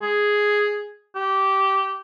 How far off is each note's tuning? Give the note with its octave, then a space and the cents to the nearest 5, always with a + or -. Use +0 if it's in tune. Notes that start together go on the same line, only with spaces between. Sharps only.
G#4 +0
G4 -15